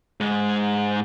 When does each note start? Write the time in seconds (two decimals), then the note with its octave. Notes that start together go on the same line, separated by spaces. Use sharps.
0.21 G#2 G#3